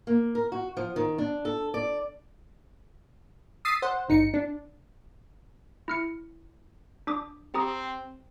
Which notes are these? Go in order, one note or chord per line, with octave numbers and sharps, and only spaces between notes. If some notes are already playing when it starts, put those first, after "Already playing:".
A#3
A#4
F#4
F3
D#3
D4
A4
D5
D#6 E6 A6 B6 C7 D#7
C5 F#5
G1 D#4 C#7
D4
E4 F6 C#7
D4 D6 D#6
C4 G4 A#5 D#6